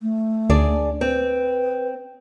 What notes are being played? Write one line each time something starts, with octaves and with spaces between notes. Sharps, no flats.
A3
D2 D4 G#4 D5
C4 B4